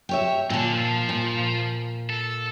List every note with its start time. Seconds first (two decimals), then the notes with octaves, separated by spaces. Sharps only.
0.09 G4 C#5 E5
0.50 A#2 D3 A5
0.73 F3
1.09 A#2
2.10 A4